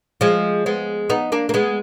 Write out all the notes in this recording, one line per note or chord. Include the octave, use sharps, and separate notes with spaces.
F3 G#3
G#3 B3
B3 D#4
A#3 D4
A#3
G#3 B3